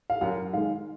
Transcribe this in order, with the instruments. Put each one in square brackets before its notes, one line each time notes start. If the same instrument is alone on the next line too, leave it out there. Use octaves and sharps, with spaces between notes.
[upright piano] F5
F#2 F#5
D#3 G#3 F5